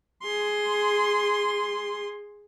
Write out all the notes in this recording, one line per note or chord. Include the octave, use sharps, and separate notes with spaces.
G#4 C6